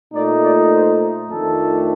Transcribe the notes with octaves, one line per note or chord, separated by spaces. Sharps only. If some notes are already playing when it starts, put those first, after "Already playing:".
A#2 A3 D#4 D5
D5
C5
F2 D#3 A3 D4 A4